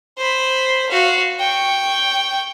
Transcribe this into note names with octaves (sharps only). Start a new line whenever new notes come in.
C5 B5
F#4 F5
G5 C#6